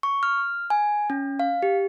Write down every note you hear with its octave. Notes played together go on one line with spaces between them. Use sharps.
C#6
F6
G#5
C#4
F5
G4